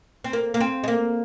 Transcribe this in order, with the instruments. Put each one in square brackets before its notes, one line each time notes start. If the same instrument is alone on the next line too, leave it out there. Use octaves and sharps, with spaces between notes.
[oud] C4
A#3
A#3
C4
G#3
A#3